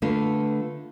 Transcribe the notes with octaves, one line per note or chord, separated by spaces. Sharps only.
D3 A3 F4 B4